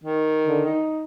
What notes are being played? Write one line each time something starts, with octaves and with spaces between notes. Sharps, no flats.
D#3
D3
D#4